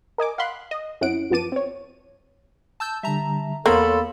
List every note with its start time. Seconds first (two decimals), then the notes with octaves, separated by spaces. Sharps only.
0.18 A#4 D#5 G#5 D6
0.38 F5 F#5 B5 C6 F#6
0.71 D#5
1.01 F#2 C#4 E4 F#5 D7
1.30 F#2 F3 B3 A5 D6 D#7
1.52 C4 C#5
2.80 A5 E6 G6
3.03 D3 G3 E5 A5 A#5
3.66 E2 A#3 B3 A4 C#5 F5 B5 C6